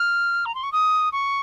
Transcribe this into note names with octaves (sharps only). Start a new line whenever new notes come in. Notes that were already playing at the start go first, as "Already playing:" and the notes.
Already playing: F6
A#5
C6
C#6
D#6
C#6